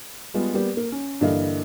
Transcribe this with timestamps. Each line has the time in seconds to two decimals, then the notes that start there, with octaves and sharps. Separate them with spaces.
0.34 G3 G#3 B3 F4
0.54 G3 A#3 B3 G4 D5
0.77 A#3
0.92 C#4
1.21 G2 D3 E3 A#3 D#5 F5